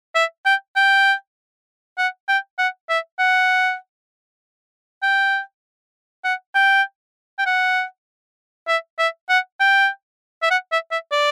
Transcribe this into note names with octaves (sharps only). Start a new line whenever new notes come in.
E5
G5
G5
F#5
G5
F#5
E5
F#5
G5
F#5
G5
G5
F#5
E5
E5
F#5
G5
E5
F#5
E5
E5
D5